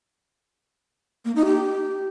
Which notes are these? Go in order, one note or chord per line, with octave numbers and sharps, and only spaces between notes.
A#3
D#4
G4